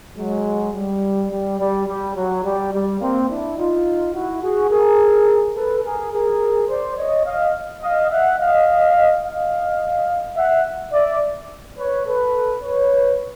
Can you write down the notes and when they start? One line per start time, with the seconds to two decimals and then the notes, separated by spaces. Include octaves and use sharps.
0.18 F#3 G#3
0.74 G3
1.31 G3
1.60 G3
1.87 G3
2.16 F#3
2.44 G3
2.73 G3
3.01 A#3 C4
3.29 D4 E4
3.58 D#4 F4
4.14 E4 F#4
4.43 F#4 G#4
4.70 G#4 A#4
5.56 A4 B4
5.83 G#4 A#4
6.12 G#4 A#4
6.69 C5 D5
6.97 C#5 D#5
7.25 D#5 F5
7.82 D#5 F5
8.10 E5 F#5
8.39 D#5 F5
9.23 D#5 F5
10.36 E5 F#5
10.93 D5 E5
11.79 B4 C#5
12.06 A4 B4
12.63 B4 C#5